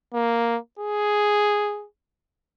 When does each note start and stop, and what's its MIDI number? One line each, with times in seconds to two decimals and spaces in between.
0.14 0.57 58
0.79 1.86 68